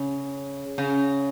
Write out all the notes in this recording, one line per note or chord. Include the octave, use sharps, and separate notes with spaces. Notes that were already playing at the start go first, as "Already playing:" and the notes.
Already playing: C#3
C#3